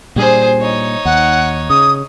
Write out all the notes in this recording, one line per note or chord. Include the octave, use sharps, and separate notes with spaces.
A#2 G3 D4 G#4 C5
D#4 C#5
D#2 F#5
C#3 D#6